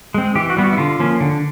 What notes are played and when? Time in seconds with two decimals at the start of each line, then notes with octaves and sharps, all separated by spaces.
0.14 G#3 C4
0.35 E3 G4
0.50 F#4
0.56 G3 B3
0.64 F#4
0.73 E4
0.77 D3 F4
1.00 F3 A#3 C#4
1.21 D3